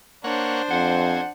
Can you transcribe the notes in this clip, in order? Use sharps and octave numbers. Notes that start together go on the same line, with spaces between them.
A#3 D4 C5 C#5 F#5
F2 C4 F#5 G#5